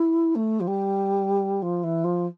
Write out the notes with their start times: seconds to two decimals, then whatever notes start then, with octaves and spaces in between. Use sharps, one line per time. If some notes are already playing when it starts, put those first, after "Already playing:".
Already playing: E4
0.35 A3
0.60 F3
0.67 G3
1.62 F3
1.83 E3
2.04 F3